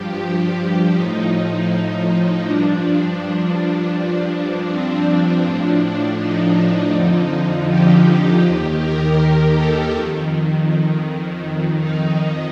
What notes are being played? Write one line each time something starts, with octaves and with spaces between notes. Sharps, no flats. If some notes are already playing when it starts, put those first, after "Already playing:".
Already playing: G2 F3 G4
G4
A2 F3 D#4
G2 F3 D4
G2 F3
C4
A2 F3 D4
D#4
F2 D3 F3
G4
D#2 D#3 G4
A#4
A#4
A4
F2 D#3
F2 D#3
D#4
D#4